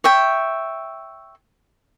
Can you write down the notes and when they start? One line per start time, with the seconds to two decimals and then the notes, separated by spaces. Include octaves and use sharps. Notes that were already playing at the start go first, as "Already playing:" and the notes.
0.04 C#5 E5 G5